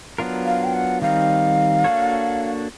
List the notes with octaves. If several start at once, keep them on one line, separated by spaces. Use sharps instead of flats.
F#3 B3 D4 F4 A#4
F5
G5
F#5
D#3 G3 C4 D#4 F5
A#3 D4 F#4 A4 C#5